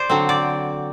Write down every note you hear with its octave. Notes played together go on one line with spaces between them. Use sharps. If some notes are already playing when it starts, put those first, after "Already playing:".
Already playing: C5 D5
D3 F#3 C4
D5